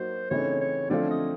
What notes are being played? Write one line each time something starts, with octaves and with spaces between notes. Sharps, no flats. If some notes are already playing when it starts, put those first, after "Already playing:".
Already playing: F#3 A#3 D#4 F#4 C5
C#3 E3 A3 C4 D#4 C#5
C#5
D3 F3 A3 C4 F4 D5
D#5